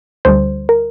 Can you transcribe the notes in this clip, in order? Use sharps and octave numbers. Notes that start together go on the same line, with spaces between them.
D2 D3 G3 C5
A#4